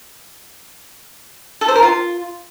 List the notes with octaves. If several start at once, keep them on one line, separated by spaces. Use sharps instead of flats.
A4
C5
A#4
F4